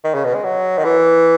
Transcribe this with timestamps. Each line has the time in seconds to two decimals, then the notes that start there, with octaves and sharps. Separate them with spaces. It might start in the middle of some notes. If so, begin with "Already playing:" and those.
0.04 D#3
0.14 C#3
0.24 B2
0.34 G#3
0.44 F#3
0.77 D#3
0.84 E3